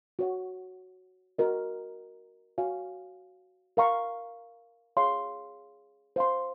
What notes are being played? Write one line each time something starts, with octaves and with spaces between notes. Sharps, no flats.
F#4 C#5 F#5
F#4 A#4 D#5
F#4 C#5 F5 G#5
A#4 F5 A#5 C#6
G#4 C#5 F5 C6
C5 F5 C6